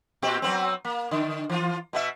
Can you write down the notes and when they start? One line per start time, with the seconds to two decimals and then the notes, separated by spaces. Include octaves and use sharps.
0.22 A#2 C4 G4
0.42 F#3 B3 C4
0.85 A#3
1.11 D3
1.50 E3 F4
1.93 B2 B3 E5